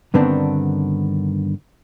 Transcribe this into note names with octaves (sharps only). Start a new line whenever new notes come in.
G2 D3 D#3 B3 C4 D4